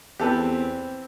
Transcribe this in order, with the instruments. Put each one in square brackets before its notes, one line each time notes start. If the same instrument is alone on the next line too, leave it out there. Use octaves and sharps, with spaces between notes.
[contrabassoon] E2 [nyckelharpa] C4 [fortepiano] G4 A4 B4